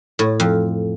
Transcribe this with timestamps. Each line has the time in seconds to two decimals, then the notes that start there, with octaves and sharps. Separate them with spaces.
0.19 A2
0.40 F2